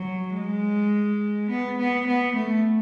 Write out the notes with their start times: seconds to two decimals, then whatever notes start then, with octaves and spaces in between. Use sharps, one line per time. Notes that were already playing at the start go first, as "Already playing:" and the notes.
Already playing: F#3
0.35 G#3
1.50 B3
1.79 B3
2.07 B3
2.36 A3